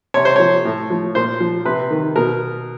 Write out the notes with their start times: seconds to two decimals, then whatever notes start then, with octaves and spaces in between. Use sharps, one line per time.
0.14 C3 C#5
0.25 C5
0.36 F3 C#5
0.65 A2
0.90 F3
1.15 A#2 C5
1.40 F3
1.65 C3 B4
1.90 D#3
2.16 B2 A#4